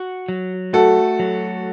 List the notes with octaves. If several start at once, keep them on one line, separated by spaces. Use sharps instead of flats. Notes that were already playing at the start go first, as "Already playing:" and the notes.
Already playing: F#4
F#3
A3 F#4 A4
F#3